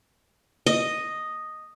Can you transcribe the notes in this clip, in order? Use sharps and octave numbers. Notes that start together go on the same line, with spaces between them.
D#5